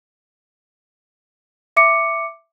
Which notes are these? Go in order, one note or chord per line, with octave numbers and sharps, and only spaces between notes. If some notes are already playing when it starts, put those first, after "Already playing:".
E5 D6 C#7